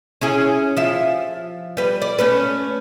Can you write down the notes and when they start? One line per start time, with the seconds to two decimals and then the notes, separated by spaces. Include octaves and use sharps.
0.21 C#4 E4 G#4
0.77 F3 E5
1.77 G3 B4
2.02 D5
2.19 A3 C#4 B4